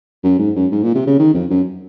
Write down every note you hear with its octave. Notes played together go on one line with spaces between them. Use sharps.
F#2
G#2
F#2
G#2
A#2
C3
C#3
D#3
F2
F#2